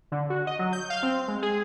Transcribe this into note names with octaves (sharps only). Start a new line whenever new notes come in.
D3
F#4
D#5
F#3
G6
F5
C4
G#3
G#4